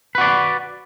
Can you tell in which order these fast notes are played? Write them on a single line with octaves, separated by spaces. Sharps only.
B4 F#4 D5